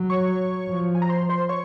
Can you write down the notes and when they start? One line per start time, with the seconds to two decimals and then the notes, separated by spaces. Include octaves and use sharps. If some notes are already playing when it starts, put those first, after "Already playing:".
Already playing: F#3
0.10 C#5 C#6
0.69 F3
0.95 G#5
1.02 A#5
1.09 C5 C6
1.29 C5 C6
1.49 C#5 C#6